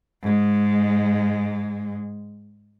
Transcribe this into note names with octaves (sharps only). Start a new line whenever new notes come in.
G#2 G#3